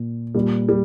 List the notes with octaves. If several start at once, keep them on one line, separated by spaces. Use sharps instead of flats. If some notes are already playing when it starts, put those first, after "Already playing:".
Already playing: A#2
A#2 G3
G3